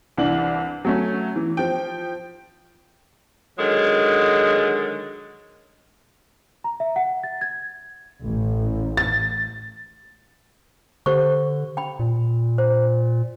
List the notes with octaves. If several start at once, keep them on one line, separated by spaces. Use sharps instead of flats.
C2 E3 D4 F#7
F#3 A3 C#4
E3
F3 G5
D3 D#3 F#3 G#3
A#5
E5
F#5
A6
G#6
A1
A6
D3 G4 C5 C#6
G5 B5
A#2
C5